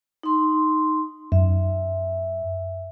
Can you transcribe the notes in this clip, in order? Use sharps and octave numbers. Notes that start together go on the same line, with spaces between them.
D#4 C6
F#2 E5